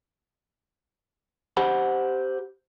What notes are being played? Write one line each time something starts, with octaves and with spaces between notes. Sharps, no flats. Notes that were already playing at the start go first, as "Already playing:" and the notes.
G4 C5 F#5 B5